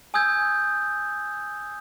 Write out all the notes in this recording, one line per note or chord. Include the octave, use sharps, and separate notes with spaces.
G#5 D#6 E6 G6 G#6